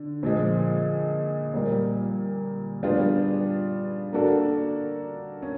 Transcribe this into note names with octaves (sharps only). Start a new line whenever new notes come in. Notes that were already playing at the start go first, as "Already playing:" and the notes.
Already playing: D3
A#2 F3 G#3
A#2 G3 A#3
G3 B3 D4 F4 G#4
A#3 D4 F#4 A4
C#4